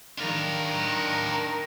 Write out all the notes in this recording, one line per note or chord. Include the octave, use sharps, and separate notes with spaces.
D#3 D4 A#4 F5